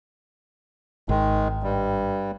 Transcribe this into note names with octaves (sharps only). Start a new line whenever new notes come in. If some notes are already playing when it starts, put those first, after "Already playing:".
G#1 D#3 G#3
G2 G3